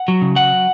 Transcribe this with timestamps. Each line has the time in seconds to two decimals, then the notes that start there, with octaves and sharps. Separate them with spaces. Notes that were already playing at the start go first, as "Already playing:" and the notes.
Already playing: F#5
0.08 F#3
0.22 C#3
0.36 F#3 F#5